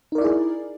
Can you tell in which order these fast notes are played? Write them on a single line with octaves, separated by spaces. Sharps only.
D#4 A#4 D5 E4 G#4